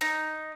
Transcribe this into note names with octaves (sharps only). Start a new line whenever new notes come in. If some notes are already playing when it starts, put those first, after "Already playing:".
D#4